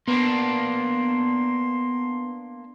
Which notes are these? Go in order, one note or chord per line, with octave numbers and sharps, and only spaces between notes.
A#3 B3 D4 C6